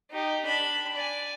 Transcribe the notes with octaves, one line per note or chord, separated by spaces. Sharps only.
D#4 G4
D4 B5
D5 G#5